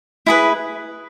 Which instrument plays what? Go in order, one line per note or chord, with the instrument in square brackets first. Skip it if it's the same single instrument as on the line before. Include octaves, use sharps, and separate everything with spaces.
[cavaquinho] E4 G#4 B4